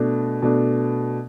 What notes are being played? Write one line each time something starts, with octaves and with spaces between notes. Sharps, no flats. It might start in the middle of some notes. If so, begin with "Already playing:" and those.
Already playing: B2 A3 D4
B2 A3 D4